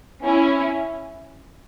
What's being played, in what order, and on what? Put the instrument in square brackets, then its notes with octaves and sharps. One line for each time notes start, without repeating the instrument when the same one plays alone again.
[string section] C#4 E4